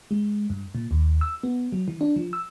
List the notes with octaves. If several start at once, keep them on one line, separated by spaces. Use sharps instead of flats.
G#3
G2
A#2
D#2
E6
B3
F#3
E3
D4
F3
E6